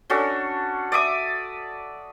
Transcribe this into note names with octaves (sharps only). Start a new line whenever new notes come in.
C#4 D4 F#4 A4
D5 E5 D6 D#6